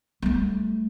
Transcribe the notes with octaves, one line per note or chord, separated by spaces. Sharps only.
G3 A3